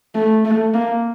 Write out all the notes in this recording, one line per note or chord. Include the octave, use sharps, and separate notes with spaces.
A3
A3
A#3